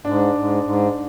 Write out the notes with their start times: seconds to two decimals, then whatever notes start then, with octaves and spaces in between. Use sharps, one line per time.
0.05 G#2 D4
0.35 G#2
0.63 G#2